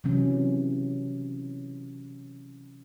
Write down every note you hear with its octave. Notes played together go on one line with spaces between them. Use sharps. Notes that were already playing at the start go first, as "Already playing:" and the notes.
C3 E3 F#3 C#4